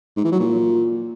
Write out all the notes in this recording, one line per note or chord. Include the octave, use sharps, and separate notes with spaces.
G#2
E3
F#3
A#2